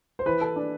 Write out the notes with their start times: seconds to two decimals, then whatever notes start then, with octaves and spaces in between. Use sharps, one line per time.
0.19 C5
0.26 E3 B4
0.41 A4
0.56 D4